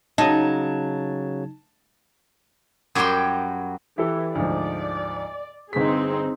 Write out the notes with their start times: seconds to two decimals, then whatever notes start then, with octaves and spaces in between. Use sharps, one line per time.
0.18 C#3 F#3 D#4 A5 G#6
2.95 F#2 F#3 G3 G4 G5 C6
3.98 E3 E4 G4 A4
4.35 D2 G#2 F3 D5
5.73 G1 C4 D#4 G#4 B6